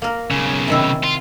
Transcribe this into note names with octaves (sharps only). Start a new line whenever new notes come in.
A#3 A#4
B1 C#3
C3 D#3 E4
F4